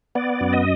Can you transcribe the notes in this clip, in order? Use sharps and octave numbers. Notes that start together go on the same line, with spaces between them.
B3 D5
F#2
D#5